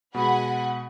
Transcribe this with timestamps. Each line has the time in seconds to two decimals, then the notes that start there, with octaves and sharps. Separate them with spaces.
0.15 B2 G#3 F#5 G#5 B5